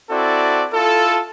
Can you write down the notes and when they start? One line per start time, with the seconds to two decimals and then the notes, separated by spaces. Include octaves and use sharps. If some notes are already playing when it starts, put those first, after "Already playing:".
0.10 C4 E4 F#4 A4 D5
0.73 E4 F4 A4